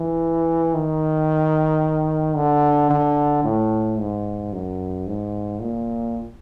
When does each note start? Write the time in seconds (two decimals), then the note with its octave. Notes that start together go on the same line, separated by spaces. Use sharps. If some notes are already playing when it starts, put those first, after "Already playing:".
Already playing: E3
0.74 D#3
2.36 D3
2.90 D3
3.44 A2
3.99 G#2
4.53 F#2
5.07 G#2
5.61 A#2